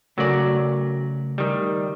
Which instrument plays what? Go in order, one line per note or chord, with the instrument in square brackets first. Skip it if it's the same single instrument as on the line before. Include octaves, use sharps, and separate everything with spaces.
[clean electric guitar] C#3 A3 A#4 [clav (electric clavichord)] F#3 D5
[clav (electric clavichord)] D#3 G3